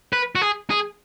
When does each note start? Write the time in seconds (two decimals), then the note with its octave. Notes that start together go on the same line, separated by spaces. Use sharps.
0.13 B4
0.35 F#4
0.41 G#4
0.70 G#4